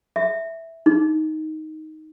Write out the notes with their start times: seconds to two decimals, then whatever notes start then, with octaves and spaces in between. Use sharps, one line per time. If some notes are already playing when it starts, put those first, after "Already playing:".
0.16 E5
0.86 D#4